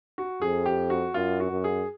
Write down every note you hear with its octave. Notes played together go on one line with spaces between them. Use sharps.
F#4
F2 G#4
G4
F#4
F#2 F4
F#4
F#2
G#4